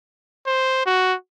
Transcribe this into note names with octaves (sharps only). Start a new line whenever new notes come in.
C5
F#4